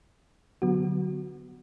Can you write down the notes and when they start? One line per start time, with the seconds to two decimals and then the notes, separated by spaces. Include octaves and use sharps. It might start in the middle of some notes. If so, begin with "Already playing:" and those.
0.62 D3 F#3 B3 F#4